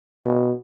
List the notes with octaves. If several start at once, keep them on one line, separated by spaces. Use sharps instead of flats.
B2